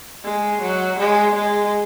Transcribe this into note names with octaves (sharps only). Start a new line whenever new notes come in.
G#3
F#3
G#3
G#3